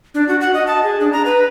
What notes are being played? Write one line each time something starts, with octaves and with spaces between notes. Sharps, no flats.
D4
F#4
F#5
D#5
A5
G#4
D4
A#5
B4